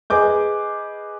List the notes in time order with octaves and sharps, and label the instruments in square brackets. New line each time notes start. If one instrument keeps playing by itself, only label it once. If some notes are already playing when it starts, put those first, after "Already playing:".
[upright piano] G#4 B4 D#5 G#5 D6 G6